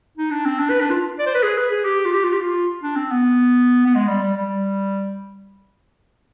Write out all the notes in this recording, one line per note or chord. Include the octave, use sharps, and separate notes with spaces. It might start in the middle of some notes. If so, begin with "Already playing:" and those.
D#4
D4
C4
D4
B4
D4
F4
D5
C5
B4
G#4
B4
G#4
G4
F4
G4
F4
G4
F4
D4
C4
B3
B3
G#3
G3
G3
G3